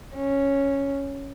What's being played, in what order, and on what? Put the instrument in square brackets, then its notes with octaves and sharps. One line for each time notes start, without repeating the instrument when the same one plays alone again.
[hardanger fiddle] C#4